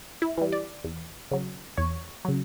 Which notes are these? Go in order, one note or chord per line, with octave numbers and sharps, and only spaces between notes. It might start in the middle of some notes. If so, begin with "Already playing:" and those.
E4
E3 G3
D5
E2
C#3 F#3
E2 C#5
C#3 F#3